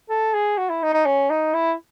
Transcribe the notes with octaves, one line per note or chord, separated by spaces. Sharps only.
A4
G#4
F#4
E4
D#4
D#4
C#4
D#4
E4